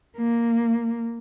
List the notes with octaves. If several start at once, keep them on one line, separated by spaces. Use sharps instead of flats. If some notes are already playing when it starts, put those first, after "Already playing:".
A#3